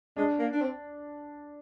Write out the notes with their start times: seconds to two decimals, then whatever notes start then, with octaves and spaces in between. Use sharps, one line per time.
0.17 G#3 D4
0.39 A#3
0.53 D4
0.61 C4